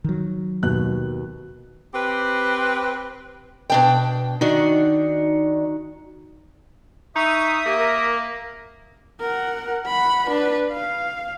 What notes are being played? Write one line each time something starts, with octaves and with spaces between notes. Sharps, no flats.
D#3 F#3
D#2 B2 F#6
C4 G4 B4
B2 D4 G5
D#3 D4 D#4 F#4
D#4 E5 C#6 D#6
A#3 G4
A#4
A#4 F#5
F#5 B5
D4 B4
F5